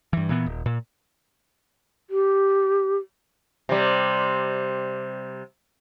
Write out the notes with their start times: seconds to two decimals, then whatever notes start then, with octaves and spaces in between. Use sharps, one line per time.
0.13 G2 E3
0.29 A#2 E3 B3
0.46 D#1
0.66 A#2
2.10 G4
3.69 C3 G3